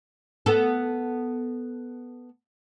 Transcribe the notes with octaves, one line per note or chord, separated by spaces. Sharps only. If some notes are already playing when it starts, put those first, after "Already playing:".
B3 A4